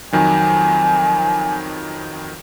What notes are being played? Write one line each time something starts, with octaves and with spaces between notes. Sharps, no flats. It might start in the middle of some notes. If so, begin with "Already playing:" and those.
F2 D#3 F#3 G#5